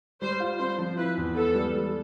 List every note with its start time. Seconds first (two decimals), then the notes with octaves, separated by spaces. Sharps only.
0.22 G3 C5
0.40 F4
0.59 C4 C5
0.78 F3
0.97 E4 B4
1.17 E2
1.36 B3 A4
1.54 G3
1.74 G3